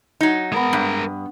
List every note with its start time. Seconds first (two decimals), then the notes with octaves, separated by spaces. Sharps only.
0.21 F#3 D#4
0.52 G#3 B3 A#4 D#6
0.73 G2